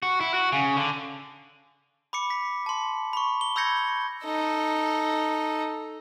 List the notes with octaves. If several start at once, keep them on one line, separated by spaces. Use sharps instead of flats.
F#4
E4
F#4
C#3
D3
B5 D6 C#7
B6
A5 C6
B5 C#6
G7
B5 E6 G6 G#6 A#6 C#7
D#4 A4